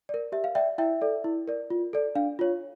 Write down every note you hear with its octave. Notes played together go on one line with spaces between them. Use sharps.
A#4 D5
G4 E5
F5
D5 E5 G5
E4 E5 G5
A4 D5
E4
A#4 D5
F4
A4 D5
D4 F5
F4 C#5